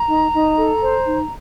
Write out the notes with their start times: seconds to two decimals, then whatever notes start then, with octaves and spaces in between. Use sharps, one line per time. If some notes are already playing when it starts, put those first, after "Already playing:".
Already playing: A#5
0.09 D#4
0.32 D#4
0.56 A4
0.81 C5
1.05 D#4